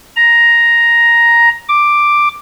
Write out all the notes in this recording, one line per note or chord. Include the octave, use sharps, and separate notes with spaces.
A#5
D6